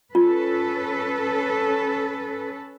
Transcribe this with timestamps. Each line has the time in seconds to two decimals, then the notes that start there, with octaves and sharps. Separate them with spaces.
0.15 C#4 F4 A4 B4